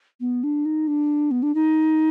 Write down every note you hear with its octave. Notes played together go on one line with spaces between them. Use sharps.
B3
D4
D#4
D4
B3
D4
D#4